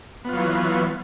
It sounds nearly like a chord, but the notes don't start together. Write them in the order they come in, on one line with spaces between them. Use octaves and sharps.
B3 F4 F#3 E3